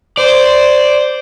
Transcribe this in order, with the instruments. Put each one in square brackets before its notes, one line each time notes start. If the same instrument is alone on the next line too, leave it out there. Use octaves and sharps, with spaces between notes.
[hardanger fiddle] C5 [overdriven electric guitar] D5